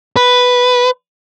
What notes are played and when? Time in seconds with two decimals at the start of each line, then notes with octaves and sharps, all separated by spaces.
0.16 B4